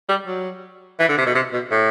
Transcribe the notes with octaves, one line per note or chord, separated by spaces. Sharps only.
G3
F#3
E3
D3
C3
B2
C3
B2
A2